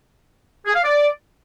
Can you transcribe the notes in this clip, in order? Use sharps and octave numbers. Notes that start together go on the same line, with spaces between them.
G#4
F5
D5